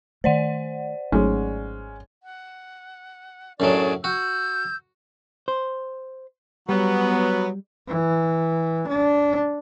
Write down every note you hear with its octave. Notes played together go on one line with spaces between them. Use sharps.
D#3 A3 C5 D5 F#5
G#1 F#3 G#3 A3 C#4 D#4
F#5
F#2 A2 F#3 D4 G#4 D5
F#4 E6 G6
C5
F#3 G3 B3
E3
D4